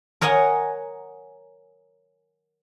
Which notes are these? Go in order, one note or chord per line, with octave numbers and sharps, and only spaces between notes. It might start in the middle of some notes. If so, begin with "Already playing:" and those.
A#4 C#5 D#5 F#5 G#5